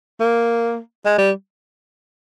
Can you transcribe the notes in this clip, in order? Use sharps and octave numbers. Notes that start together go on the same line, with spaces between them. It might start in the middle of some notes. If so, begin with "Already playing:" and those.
A#3
G#3
G3